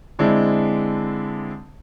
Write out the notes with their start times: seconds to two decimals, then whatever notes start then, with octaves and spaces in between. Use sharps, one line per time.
0.19 D3 G#3 C4 D4 E4